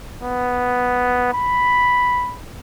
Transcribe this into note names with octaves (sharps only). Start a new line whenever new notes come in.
B3
B5